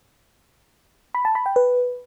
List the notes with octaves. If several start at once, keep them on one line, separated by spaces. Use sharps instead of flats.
B5
A5
B5
G5
B4